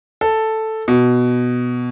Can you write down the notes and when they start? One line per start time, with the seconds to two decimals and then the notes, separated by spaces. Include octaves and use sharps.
0.21 A4
0.88 B2